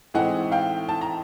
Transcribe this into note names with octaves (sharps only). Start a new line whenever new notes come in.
A2 E3 G#3 C4 D#4 F#5 G#5
F5 G5
A5
A#5